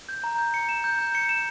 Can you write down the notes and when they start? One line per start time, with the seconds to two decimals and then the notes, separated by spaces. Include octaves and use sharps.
0.09 G6
0.24 A#5
0.38 G6
0.54 C#7
0.69 E7
0.84 G6
0.99 G6
1.15 C#7
1.29 E7